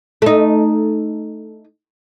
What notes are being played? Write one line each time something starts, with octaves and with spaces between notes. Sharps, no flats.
A3 D#4